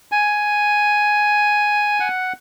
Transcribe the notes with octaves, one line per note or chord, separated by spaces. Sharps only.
G#5
F#5